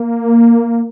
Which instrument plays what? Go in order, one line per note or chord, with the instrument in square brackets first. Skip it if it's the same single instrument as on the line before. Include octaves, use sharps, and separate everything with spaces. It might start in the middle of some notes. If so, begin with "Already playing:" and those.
Already playing: [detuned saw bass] A#3